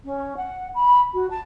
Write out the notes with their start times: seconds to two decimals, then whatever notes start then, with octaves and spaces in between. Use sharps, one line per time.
0.05 C#4
0.36 F#5
0.74 B5
1.14 F#4
1.30 A5